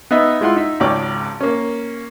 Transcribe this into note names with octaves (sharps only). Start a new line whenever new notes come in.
B3 D#4 D#5 E5
G#3 E4 F4 F#5 C6
D#4 E5
G#1 C#2 C#5 D5 G5 D6
A#3 C#4